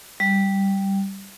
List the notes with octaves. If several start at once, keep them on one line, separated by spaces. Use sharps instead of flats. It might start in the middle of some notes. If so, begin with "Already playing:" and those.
G3